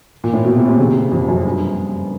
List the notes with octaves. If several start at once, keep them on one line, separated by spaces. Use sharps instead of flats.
A#2
A2
B2
C3
C3
C#3
C3
F2
F#2
G2